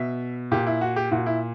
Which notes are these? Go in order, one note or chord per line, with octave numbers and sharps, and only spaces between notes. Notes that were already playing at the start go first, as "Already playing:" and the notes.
Already playing: B2 E5
A#2 G4
E4
F#4
G4
A#2 F#4
E4